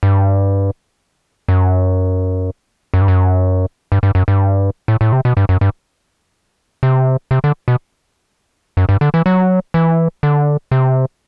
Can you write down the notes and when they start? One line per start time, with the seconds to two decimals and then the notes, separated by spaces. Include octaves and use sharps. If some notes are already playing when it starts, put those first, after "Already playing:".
0.03 G2
1.49 F#2
2.94 F#2
3.01 G2
3.08 F#2
3.92 G2
4.03 G2
4.15 F#2
4.28 G2
4.88 A2
5.01 A2
5.12 C3
5.25 B2
5.37 G2
5.49 F#2
5.61 G2
6.83 C3
7.31 C3
7.44 D3
7.68 B2
8.77 F#2
8.89 G2
9.01 D3
9.14 E3
9.26 F#3
9.74 E3
10.23 D3
10.71 C3